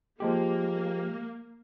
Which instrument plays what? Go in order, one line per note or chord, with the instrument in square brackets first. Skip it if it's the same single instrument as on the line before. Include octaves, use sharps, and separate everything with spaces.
[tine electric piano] F3 G#3 G4 [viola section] A#3